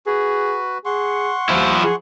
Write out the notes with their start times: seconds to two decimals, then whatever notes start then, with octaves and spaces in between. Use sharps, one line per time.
0.06 F#4 G#4 B4
0.85 G#4 F#5 C6 C#6
1.49 D#2 F3 E4
1.84 G#4